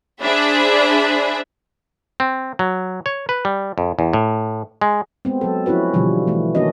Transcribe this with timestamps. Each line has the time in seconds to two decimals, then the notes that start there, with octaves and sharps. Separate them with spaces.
0.22 D4 G#4 C5 E5 B5
2.20 C4
2.59 F#3
3.06 C#5
3.29 B4
3.45 G3
3.78 F2
3.99 E2
4.13 A2
4.81 G#3
5.25 G#3 B3 C4
5.41 F#3 A4
5.66 F3 C#4 E4 F#4 B4
5.94 B2 D3 E3 F3 G3
6.27 E3 A3
6.55 D#3 A#3 C#4 D4 F#4 D#5